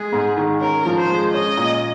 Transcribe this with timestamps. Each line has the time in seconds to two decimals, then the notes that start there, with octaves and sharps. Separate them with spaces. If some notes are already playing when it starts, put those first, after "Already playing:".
Already playing: G#3 G#4
0.13 G#2
0.37 D#3
0.60 C#4 A#4
0.85 F3
0.98 C5
1.10 G#3
1.33 C#4 D#5
1.57 A#2